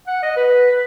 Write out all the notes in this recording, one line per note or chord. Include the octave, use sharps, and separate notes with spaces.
F#5
D#5
B4
B4